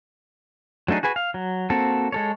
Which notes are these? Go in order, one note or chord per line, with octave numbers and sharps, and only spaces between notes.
F#3 A3 D4 D#4 G#4
F#4 G#4 B4 G#5
F5
F#3
A#3 C4 F#4 A4
G#3 A4 C#5